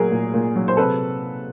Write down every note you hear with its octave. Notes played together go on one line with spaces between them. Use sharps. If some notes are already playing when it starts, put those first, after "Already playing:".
Already playing: A#2 F#3 A#3 G#4 A#4
A#2
A#2
F#3
C5
C3 A4 B4